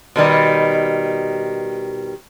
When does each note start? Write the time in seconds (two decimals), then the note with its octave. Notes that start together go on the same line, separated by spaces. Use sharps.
0.16 B2 D#3 G3